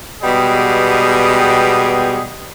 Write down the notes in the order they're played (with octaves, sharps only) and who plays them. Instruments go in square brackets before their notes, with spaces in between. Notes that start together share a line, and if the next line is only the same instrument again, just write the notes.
[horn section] B2 G3 G#3 B3 G4 G#4